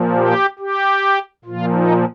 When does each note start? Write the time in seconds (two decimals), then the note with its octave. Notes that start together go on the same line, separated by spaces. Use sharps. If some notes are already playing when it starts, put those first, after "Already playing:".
Already playing: A#2 F3
0.16 G4
0.59 G4
1.45 A#2 F3 F4
1.73 D#4